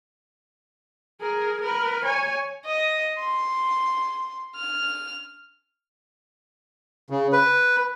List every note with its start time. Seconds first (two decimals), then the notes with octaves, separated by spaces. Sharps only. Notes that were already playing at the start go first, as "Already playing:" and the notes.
1.21 G#4 A#4
1.61 A#4 B4
2.04 C#5 G#5
2.65 D#5
3.18 C6
4.56 F6
7.10 C#3
7.33 B4